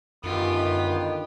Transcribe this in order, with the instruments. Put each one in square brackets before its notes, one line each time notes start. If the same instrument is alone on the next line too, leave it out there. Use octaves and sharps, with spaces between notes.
[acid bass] F#2 [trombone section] D3 D#3 [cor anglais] B3 [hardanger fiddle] F4 G4